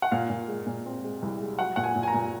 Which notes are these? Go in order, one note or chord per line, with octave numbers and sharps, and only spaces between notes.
F#5
A#2 F5
A#2
G#3
A#2
C4
G#3
C2
G#3
F#3 F#5
A#2 F#5
G#5
A#2
G#5
A#5
A#2